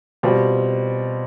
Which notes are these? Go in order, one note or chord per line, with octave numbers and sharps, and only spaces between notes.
B2 G3 C4 F4